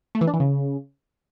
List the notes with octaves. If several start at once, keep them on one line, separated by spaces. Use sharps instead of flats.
A3
E3
D4
E3
C#3